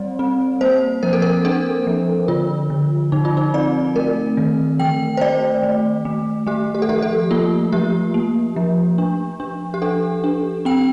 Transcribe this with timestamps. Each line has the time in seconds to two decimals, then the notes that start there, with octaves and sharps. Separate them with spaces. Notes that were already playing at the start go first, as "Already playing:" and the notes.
Already playing: G3 C4 D5
0.19 C4
0.61 A#3 C5
1.03 F3 A#4
1.13 A4
1.22 A#4
1.45 D4 A4
1.87 F3
2.28 D3 F4
2.70 D3
3.12 D3 D#4
3.25 F4
3.37 D#4
3.54 C4 D5
3.96 A3 A#4
4.37 D#3
4.79 D#3 G5
5.17 C5
5.21 A3 D5
5.63 A3
6.05 A3
6.47 A3 G4
6.75 G4
6.82 A4
6.89 F3 G4
7.02 A4
7.31 A#3 F4
7.72 F3 G4
8.14 A#3
8.56 F3
8.98 D4
9.40 D4
9.74 G4
9.82 D4 A4
10.24 D4
10.65 C4 G5